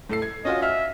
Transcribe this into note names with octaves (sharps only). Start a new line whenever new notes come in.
A2 A4 C7
G#6
C#4 F4 F#4 D#5
E5 F6